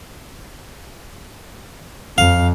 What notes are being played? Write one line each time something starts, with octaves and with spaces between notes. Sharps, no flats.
F2 F5